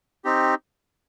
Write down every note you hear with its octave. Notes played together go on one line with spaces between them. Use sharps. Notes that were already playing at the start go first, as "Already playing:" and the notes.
C4 D#4 G4